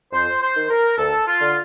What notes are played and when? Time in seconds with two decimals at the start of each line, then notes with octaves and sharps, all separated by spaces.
0.13 F2 C5
0.41 C5
0.56 D#3
0.70 A#4
0.98 D2 A4
1.27 F4
1.41 D3